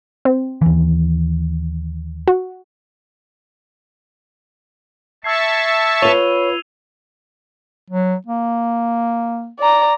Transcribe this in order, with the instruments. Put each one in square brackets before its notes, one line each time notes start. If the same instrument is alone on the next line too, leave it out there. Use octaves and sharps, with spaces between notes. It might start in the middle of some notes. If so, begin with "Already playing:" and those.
[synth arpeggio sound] C4
[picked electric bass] D#2 E3
[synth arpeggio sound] F#4
[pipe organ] E5 A5 C#6 [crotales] E6 G#6 C7
[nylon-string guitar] F4 B4 [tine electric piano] C#5 [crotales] D#7 F7 G7
[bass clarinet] F#3
A#3
[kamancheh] D5 A#5